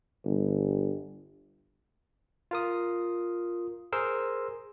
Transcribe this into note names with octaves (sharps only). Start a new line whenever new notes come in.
G1
F4 A#4 D#6
G#4 A#4 C5 C6 E6